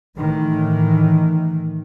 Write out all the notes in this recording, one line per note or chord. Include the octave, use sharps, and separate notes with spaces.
A2 D#3 E3